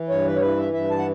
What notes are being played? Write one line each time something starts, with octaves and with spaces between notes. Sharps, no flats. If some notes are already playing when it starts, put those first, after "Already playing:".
Already playing: E3
G2 C#5
B4
C#5
E3 B4
E5
G2 E5
A5
F#5